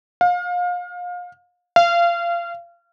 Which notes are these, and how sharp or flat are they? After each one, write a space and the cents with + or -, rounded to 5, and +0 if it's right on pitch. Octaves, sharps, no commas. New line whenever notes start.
F5 +30
F5 -25